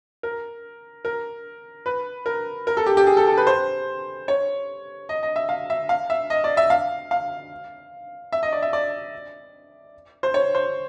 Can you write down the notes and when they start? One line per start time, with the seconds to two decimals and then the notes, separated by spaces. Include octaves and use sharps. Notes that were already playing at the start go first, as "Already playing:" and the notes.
0.23 A#4
1.05 A#4
1.86 B4
2.26 A#4
2.67 A#4
2.77 A4
2.86 G4
2.97 G4
3.07 G#4
3.17 A4
3.27 A4
3.37 B4
3.47 C5
4.28 C#5
5.09 D#5
5.23 D#5
5.36 E5
5.49 F5
5.70 E5
5.89 F5
6.10 E5
6.30 D#5
6.44 D5
6.57 E5
6.70 F5
7.11 F5
8.32 E5
8.43 D#5
8.52 D5
8.62 E5
8.73 D5
10.23 C5
10.34 C#5
10.55 C5